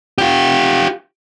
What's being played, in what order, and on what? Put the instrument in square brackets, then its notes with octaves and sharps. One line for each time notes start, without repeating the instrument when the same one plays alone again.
[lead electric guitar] F4 G4